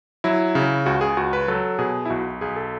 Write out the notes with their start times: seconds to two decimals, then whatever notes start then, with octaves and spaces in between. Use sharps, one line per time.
0.24 F#3 E4
0.55 C#3
0.86 C#2 F#4
1.01 G#4
1.17 C#2 F#4
1.33 B4
1.48 F#3 A4
1.79 B2 G#4
2.05 E4
2.10 B1 F#4
2.41 B1 G#4
2.56 A4